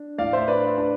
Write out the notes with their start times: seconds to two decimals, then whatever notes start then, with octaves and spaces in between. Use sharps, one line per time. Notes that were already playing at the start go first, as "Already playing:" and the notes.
Already playing: D4
0.18 A2 D5 F5
0.33 C5 E5
0.48 D4 B4 D5
0.78 D4